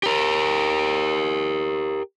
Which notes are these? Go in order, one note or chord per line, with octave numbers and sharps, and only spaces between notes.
G4 A#4